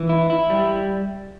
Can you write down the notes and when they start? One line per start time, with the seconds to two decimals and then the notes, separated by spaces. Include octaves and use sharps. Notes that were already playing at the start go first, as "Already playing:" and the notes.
Already playing: E3
0.09 E4
0.30 E4
0.50 G3